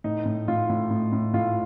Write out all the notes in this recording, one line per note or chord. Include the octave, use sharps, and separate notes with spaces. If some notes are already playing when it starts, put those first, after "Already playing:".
A2 D#4
A2
A2 F4
A2
A2
A2
A2 F4